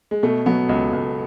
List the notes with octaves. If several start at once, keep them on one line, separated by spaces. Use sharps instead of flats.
G#3
B2 A3
F#3 B3
C#2
C#2